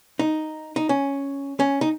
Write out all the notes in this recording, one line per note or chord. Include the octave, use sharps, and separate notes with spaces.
D#4
D#4
C#4
C#4
D#4